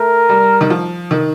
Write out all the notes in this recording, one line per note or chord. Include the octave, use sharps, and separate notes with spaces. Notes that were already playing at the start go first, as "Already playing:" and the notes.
Already playing: A3 A#4
G3
D#3
F3
D#3